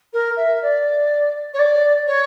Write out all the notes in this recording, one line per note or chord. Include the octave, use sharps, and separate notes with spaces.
A#4
E5
D5
C#5
D5
C#5